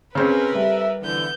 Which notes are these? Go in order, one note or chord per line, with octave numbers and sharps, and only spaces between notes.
C#3 C4 C#4 A#4 B4
G3 C4 A4 E5
F2 D3 E3 B3 G6